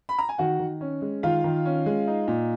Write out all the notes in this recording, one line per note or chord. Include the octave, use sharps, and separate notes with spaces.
B5
A#5
G#5
D#3 F#4 F#5
D#3
C#4
G#3
D#3 F4 F5
D#3
C#4
G#3
D#4
A#2